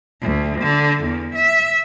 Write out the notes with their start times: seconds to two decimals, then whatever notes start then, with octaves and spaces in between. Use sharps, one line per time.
0.22 D2
0.61 D3
1.03 E2
1.35 E5